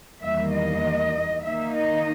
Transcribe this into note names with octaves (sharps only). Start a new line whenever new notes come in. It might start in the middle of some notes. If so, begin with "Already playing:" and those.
E2 D#3 G3 A#3 E5
D#5
D#3 A#3 D#4 E5
D#5